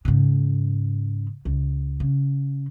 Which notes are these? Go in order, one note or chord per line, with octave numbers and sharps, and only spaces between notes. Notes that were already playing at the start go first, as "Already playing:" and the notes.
G#2 C#3
C#2
C#3